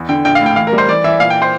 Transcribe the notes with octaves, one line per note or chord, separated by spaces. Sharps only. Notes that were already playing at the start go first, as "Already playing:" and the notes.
Already playing: E2
D3 G5
A#1 G5
F5
A2 G5
E3 F5
A#4
G3
C5
E3 D5
E3 E5
A#2 F5
G5
C5